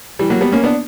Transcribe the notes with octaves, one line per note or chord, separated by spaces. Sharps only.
E3 G3
F#3 A#3
G3 B3
A#3 C#4
B3 D4